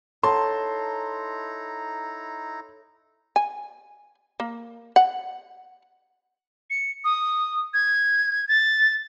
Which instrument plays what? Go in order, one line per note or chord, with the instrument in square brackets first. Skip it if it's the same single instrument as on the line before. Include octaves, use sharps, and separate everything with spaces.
[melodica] D#4 E4 A#5 [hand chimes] A4 C#5 [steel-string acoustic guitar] A5 [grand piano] C6
[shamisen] G#5
A#3
F#5
[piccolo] C#7
D#6
G#6
A6